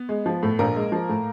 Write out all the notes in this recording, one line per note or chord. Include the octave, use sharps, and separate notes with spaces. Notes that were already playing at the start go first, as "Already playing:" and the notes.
Already playing: B3
G#3
F3
A2
A#1 A#3 A#4
G#3
F3
A2